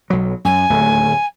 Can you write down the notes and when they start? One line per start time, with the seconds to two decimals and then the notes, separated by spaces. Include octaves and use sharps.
0.10 B1 F#3
0.45 F#2 G#5
0.70 D1 D#2 A3